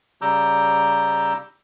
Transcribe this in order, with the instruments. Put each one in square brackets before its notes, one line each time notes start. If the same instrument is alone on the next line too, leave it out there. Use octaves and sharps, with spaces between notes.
[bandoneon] C#3 G3 A#5 D6 E6 G6